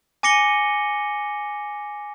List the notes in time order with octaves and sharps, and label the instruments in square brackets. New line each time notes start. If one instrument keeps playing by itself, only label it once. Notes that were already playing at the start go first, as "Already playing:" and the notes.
[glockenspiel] G#5 D6 A#6 C#7 D#7 G7